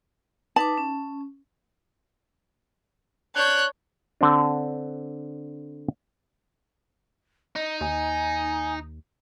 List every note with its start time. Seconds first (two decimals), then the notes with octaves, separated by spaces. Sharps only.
0.56 D#4 B4 A5 D6
0.78 C#4
3.36 D4 C#5 F#6 G6
4.21 D3 C4 D4
7.56 D#4 D#5
7.81 D#2 G#5